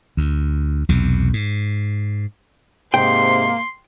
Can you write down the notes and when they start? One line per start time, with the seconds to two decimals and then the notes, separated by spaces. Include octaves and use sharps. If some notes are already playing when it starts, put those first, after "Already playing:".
0.17 D2
0.89 B1 E2 C3
1.33 G#2
2.94 G#2 C3 A#3 G5 C6